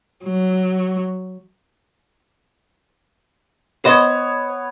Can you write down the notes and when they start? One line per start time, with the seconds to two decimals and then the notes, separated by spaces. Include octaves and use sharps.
0.24 F#3
3.85 B3 C5 C#5 D#5